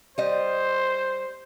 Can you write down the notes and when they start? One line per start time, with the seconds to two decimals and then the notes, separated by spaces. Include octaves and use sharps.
0.18 G3 C5 D#5